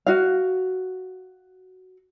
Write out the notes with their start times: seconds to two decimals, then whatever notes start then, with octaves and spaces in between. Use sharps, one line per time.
0.07 F#4 F5